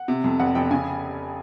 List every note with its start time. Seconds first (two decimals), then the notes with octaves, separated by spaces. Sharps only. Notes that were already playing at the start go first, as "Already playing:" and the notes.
Already playing: F#5
0.08 C3
0.24 F2
0.40 F1 F#5
0.55 F1 G5
0.71 C#3 G#5